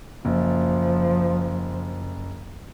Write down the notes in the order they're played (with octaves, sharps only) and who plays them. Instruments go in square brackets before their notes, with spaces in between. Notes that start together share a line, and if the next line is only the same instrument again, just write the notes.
[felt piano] F#1 [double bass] F3